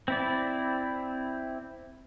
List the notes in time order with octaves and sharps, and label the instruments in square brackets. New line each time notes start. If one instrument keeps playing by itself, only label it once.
[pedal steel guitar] C4 E4 D5